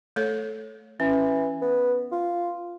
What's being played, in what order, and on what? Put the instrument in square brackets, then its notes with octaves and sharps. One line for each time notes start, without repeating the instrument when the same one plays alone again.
[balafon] A3 A4 C#5
[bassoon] E3 [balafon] C#4
[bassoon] B3
F4